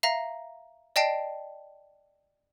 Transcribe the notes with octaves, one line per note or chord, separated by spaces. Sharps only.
E5 F5 A#5 A#6
D5 D#5 G5 A5 C7 D7